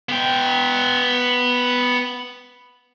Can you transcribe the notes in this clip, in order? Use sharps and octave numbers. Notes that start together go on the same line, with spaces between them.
B3 G5